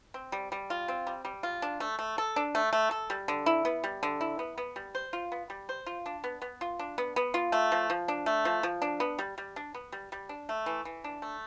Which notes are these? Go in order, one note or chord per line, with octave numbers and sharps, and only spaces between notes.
C4
G3
G3
F4
C4
G3
G3
F4
D4
A3
A3
A4
D4
A3
A3
A4
G3
D3
E4
B3
G3
D3
E4
B3
B3
G3
C5
F4
B3
G3
C5
F4
D4
B3
B3
F4
D4
B3
B3
F4
A3
F3
F3
D4
A3
F3
F3
D4
B3
G3
G3
D4
B3
G3
G3
D4
A3
E3
E3
D4
A3